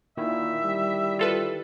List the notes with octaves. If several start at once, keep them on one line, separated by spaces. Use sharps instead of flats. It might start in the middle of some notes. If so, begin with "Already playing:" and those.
A#2 D#3 E4 E5
G3
F4 A4 B4